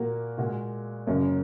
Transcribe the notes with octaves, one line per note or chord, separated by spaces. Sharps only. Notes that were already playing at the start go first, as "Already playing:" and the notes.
Already playing: A#2 A#3 F#4 A#4
A#2 G#3 F#4 A#4
F#1 F#2 C#3 A#3